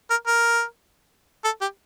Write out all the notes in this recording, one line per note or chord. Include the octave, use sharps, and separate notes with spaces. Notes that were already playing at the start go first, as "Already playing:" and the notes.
A#4
A#4
A4
G4